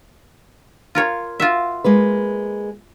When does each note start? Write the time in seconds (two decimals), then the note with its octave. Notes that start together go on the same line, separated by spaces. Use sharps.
0.95 F4 A#4 C#5
1.40 F4 F#4 E5
1.84 G#3 A#3 B4